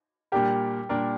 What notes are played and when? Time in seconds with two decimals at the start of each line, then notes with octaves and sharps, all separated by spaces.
0.32 A#2 G3 D4 G4 A#4
0.89 A#2 G3 D4 A#4